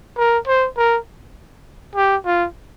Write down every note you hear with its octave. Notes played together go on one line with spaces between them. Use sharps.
A#4
C5
A#4
G4
F4